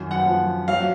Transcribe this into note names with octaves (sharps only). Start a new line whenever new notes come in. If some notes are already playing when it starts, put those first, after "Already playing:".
Already playing: F#2 D#3
F#5
F3
F#3 F5